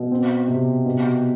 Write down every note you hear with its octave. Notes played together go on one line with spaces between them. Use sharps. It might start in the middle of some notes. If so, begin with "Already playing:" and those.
Already playing: B2
C4
C3
B2